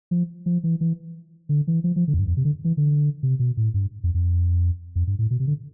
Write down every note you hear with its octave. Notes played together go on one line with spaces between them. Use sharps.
F3
F3
E3
E3
D3
E3
F3
F3
D3
F2
G2
F2
C3
D3
E3
D3
C3
B2
A2
G2
F2
F2
F2
G2
A2
B2
C3
D3